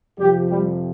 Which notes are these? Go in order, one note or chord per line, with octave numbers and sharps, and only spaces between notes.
F2 C3 F3 G3 G4
G3 G4